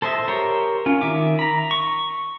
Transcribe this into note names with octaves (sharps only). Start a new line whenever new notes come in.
A4 C5 D#5 E5
G4 A#4 C#5 C6
C#4 F4
D#3 E5 D6
A#5 B5
C#6